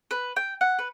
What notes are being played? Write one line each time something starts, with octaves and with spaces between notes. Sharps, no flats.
B4
G5
F#5
B4